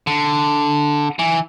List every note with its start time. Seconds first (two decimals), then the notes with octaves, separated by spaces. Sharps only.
0.07 D3
1.19 E3